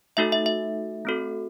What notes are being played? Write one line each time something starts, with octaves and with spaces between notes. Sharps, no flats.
A3 D#4 F#4 A4 E5
E5
E5
A3 C4 F#4 A4